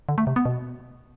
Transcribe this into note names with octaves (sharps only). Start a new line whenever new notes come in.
D3
A3
C3
B3
B2